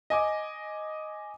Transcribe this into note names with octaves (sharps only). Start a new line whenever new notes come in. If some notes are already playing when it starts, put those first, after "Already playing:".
D#5 G#5 D6